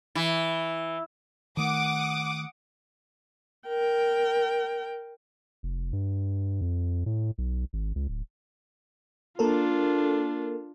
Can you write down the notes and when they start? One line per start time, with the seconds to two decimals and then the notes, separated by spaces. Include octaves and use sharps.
0.15 E3
1.57 D#3 A3 F#5 D6 D#6
3.68 A#4 G5
5.63 F1
5.93 G2
6.61 F2
7.06 A2
7.38 B1
7.73 G#1
7.96 C#2
8.08 D1
9.39 A#3 D4 F4 A4 A#4